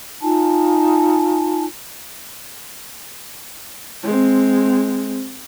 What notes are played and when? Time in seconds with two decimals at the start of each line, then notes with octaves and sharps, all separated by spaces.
0.22 D#4 F4 G#5 A5
4.04 G#3 C4